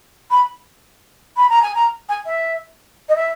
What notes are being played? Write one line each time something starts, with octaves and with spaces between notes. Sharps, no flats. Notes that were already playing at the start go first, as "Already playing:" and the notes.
B5
B5
A#5
G#5
A#5
G#5
E5
D#5
E5